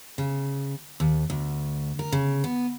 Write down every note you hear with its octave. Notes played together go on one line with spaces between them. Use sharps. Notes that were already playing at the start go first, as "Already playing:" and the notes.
C#3
D#2
D2
A#4
C#3
B3